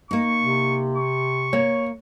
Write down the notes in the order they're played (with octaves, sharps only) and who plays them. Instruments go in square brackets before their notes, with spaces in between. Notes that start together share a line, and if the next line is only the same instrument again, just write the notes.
[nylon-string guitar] A#3 D#4 [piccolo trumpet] C#6
[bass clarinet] C3
[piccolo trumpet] C#6
[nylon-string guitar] A#3 [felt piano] C#5